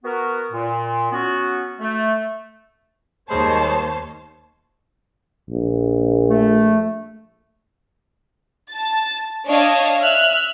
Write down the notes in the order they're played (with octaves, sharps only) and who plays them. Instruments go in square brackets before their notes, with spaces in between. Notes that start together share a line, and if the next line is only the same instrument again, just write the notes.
[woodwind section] B3 F#4 A#4
A#2
F#3 B3 C#4 F#4
A3
[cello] D#2 C5 [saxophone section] G3 G#3 [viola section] A#3 C#5 [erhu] A5
[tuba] A#1
[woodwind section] A3
[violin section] A5 A6
D4 C#5 D#5 F5 A5 G#6
E5 F6 F#6